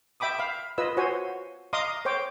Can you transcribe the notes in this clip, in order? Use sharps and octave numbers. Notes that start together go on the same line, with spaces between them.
E5 G5 B5 D6 D#6
F5 B5
F4 B4 D#5 E6
F#4 C5 C#5 F#5 G#5
D#5 F5 A#5 C6 D6 D#6
C5 C#5 G5 D6